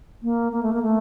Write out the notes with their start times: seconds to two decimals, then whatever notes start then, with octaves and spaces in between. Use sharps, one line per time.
0.23 A#3
0.52 A#3
0.63 A3
0.73 A#3
0.83 A3